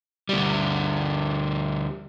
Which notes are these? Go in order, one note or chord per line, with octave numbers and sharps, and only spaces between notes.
D2 G3